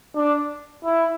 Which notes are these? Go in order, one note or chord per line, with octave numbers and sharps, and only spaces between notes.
D4
E4